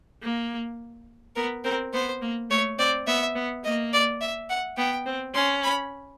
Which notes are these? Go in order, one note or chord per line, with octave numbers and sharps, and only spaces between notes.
A#3
B3 A#4
C4 A#4
B3 C5
A#3
A3 C#5
C4 D5
B3 E5
B3
A#3 D#5
D5
E5
F#5
B3 G5
C4
C#4 C6
B5